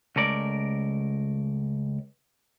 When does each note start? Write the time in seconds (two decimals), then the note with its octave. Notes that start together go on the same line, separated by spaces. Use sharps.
0.16 C#2 A3 A#4 D5